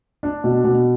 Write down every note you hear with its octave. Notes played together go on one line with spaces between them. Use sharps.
D4
B2
B2